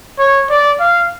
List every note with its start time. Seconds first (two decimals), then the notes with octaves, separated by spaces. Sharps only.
0.19 C#5
0.50 D5
0.80 F5